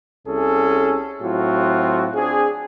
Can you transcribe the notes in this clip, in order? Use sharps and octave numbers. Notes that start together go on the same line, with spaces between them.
C2 C3 C#4 G#4 A4
A2 F#3 C4 F4 F#4
C4 D4 G#4